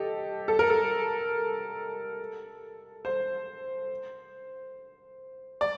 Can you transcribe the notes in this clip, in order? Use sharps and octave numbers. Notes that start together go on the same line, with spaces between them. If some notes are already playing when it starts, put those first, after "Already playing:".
Already playing: G4 A4 D#5
A4
A#4
A4
C5
D5